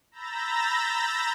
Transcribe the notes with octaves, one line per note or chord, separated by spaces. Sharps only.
A#5 B5 E6 G6 A6 A#6